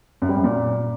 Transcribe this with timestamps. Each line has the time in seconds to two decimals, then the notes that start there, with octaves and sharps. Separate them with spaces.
0.22 F#2
0.29 G3
0.36 F#2
0.44 A#2